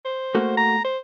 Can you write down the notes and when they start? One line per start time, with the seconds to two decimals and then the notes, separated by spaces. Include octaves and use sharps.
0.05 C5
0.35 A3 A#3 F#4
0.57 A#5
0.84 C5